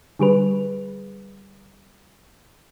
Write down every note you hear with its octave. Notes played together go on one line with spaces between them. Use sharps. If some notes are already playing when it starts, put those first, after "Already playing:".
D3 G3 G#4 B4